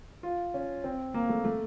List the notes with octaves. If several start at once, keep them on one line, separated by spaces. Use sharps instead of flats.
F4
C#4
C4
A#3
A3
A3